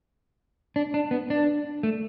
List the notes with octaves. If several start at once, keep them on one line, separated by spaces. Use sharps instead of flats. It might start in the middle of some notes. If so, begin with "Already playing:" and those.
D4
D4
B3
D4
A3